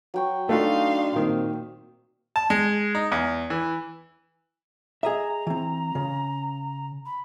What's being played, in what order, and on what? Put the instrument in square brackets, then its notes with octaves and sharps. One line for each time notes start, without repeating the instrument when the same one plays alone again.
[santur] F#3 G5 C#6
[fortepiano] A3 F4 F#4 [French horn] D4 [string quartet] D#4 F5 C6
[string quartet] A#2 [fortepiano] D#3 [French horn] C4
[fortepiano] A5
G#3
D#4
E2
E3
[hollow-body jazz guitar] G#4 D#5 E5 [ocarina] A#5
[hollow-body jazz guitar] E3 C4
C#3
[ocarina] B5